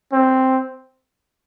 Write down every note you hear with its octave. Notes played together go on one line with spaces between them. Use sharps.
C4